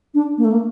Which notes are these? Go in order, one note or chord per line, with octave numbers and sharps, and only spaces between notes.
D4
A#3
A3
A#3